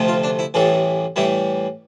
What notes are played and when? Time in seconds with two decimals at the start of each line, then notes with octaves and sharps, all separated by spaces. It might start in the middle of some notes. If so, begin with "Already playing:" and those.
Already playing: D2 C3 F3 A3
0.08 F4
0.23 D4
0.39 E4
0.54 A1 A2 E3 G3 A4
1.16 A2 E3 G3 E4